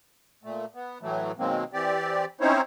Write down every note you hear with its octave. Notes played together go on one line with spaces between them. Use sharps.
A#2 A3
B3
A2 E3 F#3 A3
B2 D#3 F#3 G#3 A#3 C4
E3 C4 G4 D5
C4 C#4 D#4 E4 C5 C#5